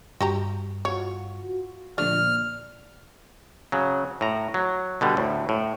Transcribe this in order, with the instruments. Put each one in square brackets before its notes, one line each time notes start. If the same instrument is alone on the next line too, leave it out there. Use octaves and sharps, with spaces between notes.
[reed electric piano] G2 [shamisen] F#4 G4 A#5
[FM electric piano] F4 F#4 [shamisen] C#5
[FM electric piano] A#2 D3 F3 [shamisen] A3 D4 [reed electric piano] D5 [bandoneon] F6
[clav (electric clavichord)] C#3 F#3
A2 A#5
F#3
B2 D3 G3
D2 A2
A2